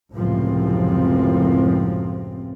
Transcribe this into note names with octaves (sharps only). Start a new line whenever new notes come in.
C#2 F#2 A2 C3 F3 C4